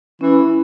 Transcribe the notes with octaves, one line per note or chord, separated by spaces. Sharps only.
E3 C#4
E4